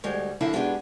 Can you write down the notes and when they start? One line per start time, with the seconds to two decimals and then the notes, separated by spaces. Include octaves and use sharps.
0.04 D2 G3 G#3 C#5
0.41 F#2 D3 A#3 E4 A5
0.53 B2 G#3 B3 D4 G4 G#4